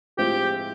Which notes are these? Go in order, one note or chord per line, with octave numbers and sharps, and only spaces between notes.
A2 F3 G#3 C4 F4 G4